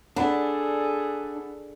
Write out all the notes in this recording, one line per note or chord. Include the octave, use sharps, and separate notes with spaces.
D4 G#4 A4 F#5 B5